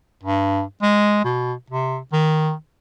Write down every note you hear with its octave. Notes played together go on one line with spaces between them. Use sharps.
G2
G#3
B2
C3
D#3